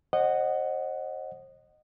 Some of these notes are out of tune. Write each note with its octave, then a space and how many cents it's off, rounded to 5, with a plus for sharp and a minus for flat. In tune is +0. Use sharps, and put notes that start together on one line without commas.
C5 +35 D#5 -20 F#5 +0